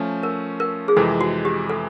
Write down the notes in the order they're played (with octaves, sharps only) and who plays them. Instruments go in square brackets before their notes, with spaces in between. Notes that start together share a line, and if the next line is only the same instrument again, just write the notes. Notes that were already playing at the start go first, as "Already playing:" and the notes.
Already playing: [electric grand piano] F3 A3 C#4
[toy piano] A#4
A#4
G#4
[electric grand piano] F2 C3 E3 G#3 [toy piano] A4
[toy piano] F#4
G4
A4